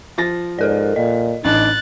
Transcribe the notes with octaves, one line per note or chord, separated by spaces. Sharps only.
F3 A6 A#6
G#2 A4 A#4 D5
A#2 D#5
A1 D4 D#4 F#6 A6